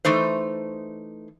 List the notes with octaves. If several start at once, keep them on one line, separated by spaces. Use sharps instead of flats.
E3 A3 D#4 C5